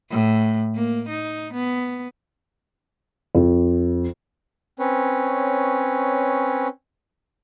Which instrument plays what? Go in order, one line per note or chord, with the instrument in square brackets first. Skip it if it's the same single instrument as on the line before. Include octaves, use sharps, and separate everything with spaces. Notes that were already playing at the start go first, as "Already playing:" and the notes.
[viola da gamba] A2
A#3
D#4
B3
[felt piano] F2
[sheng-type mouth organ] C4 C#4 B4 C#5